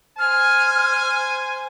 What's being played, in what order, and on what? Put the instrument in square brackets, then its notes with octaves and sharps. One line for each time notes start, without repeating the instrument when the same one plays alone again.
[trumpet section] C5 G#5 [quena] F6